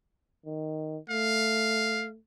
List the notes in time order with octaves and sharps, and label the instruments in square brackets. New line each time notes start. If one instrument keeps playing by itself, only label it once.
[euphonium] D#3
[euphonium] A3 [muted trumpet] F5